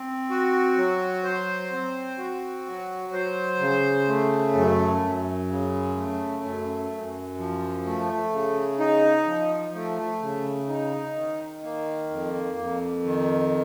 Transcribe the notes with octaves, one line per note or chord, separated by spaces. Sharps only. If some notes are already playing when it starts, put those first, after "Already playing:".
Already playing: C4
F#4
F#3
C5
C4
F#4
F#3
C5
C#3
A3
F#2
F#2
C#3
A3
F#2
F#2
F3
A3
C#3
D#4
F3
A3
C#3
D#4
D#3
A#3
F2
F2
D#3